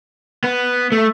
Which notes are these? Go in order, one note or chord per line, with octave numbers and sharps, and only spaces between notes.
B3
A3